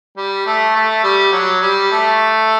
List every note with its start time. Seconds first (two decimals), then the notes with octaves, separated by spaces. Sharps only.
0.17 G3
0.46 A3
0.76 A3
1.03 G3
1.33 F#3
1.62 G3
1.91 A3